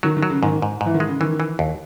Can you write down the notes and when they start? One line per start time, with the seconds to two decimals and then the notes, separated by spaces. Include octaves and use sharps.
0.03 D#3 F#3
0.17 D#3
0.23 F#3
0.30 C#3
0.43 G#2 D#3
0.62 G#2
0.81 G#2
0.86 E3
0.94 D#3
1.00 G#3
1.07 C#3
1.20 D#3 E3
1.40 E3
1.59 D#2